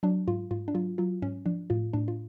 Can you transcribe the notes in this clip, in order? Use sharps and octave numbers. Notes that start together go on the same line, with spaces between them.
F#3 D4
G#2 F4
G#2 F4
D4
F#3 F4
F#3 F4
G#2 C#4
F3 D4
A2 F4
A2 D4
F4